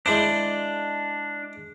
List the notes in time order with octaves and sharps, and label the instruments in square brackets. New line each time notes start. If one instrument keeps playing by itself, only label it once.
[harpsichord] G#3 E4 C5 [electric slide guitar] D4